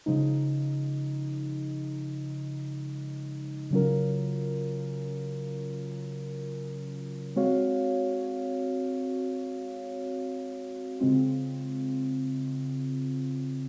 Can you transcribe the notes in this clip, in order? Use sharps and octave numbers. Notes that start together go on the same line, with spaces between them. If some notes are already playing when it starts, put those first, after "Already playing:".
C#3 F3 G#3 D#4
C#3 F#3 C#4 F4 A#4
G#3 C4 F#4 C#5 F5
C#3 G#3 C4 F4